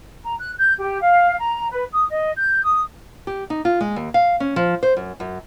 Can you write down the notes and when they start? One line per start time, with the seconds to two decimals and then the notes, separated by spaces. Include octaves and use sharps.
0.24 A#5
0.38 F#6
0.57 G6
0.78 G4
1.00 F5
1.38 A#5
1.70 B4
1.92 D#6
2.09 D#5
2.36 G6
2.62 D#6
3.27 G4
3.50 D#4
3.65 F4
3.81 G#3
3.96 D#2
4.14 F5
4.40 C#4
4.56 F3
4.83 C5
4.97 F#2
5.20 F#2